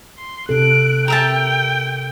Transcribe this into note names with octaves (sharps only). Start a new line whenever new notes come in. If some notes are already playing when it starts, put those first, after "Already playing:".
C6
C3 A4 F#6 D7
A#4 E5 G5 A5